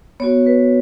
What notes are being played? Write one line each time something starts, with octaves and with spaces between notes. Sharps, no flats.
B3 F#4 C#5
B4